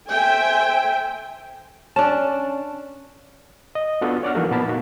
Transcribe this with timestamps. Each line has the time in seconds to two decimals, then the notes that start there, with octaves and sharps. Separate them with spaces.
0.10 A4 C5 E5 G5 G#5
1.96 C#4 D4 A5
3.75 D#5
4.01 B3 D4 F4 F#4 A4
4.23 C#5 D5 F#5 F6
4.35 E3 F3 A#3 D#4 F#4 A4
4.51 A#2 B3 A#4 A5 B5
4.67 A#3 D#4 F#4